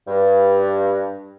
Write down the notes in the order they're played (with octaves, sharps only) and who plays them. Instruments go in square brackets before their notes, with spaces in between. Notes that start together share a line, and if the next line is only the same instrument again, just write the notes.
[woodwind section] G2